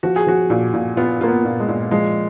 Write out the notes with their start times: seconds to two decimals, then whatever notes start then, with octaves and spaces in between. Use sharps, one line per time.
0.03 F3 F#4
0.16 G#4
0.27 F3 F#4
0.50 A#2
0.74 A#2
0.97 B3 F4
1.21 A#3 F4
1.28 B3
1.45 A#2
1.60 G#3
1.68 A#2
1.91 F3 G#3